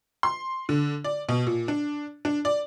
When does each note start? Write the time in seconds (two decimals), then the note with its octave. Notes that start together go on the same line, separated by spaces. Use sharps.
0.23 C6
0.69 D3
1.04 D5
1.29 B2
1.47 A#2
1.68 D4
2.25 D4
2.45 D5